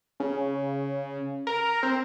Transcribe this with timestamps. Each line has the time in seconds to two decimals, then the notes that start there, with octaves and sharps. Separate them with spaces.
0.20 C#3
1.47 A#4
1.83 C4